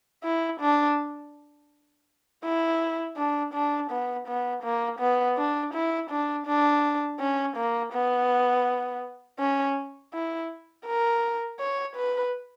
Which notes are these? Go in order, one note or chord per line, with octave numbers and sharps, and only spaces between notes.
E4
D4
E4
D4
D4
B3
B3
A#3
B3
D4
E4
D4
D4
C#4
A#3
B3
C#4
E4
A#4
C#5
B4